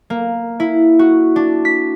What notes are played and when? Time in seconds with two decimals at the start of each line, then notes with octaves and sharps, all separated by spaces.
0.10 A#3
0.60 E4
0.99 F#4
1.36 D4
1.65 B6